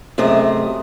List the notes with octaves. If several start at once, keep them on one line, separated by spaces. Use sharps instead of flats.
F#2 C3 A3 G#4 D#5